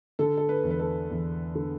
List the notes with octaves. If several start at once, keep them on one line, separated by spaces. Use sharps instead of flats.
D3 A4
A4
B4
E2
B4
A4
E2
D3